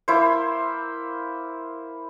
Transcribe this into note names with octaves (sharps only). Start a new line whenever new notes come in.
A#3 E4 C5